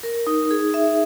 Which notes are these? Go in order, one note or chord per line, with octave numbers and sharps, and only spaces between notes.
A#4
D#4
G#4
E5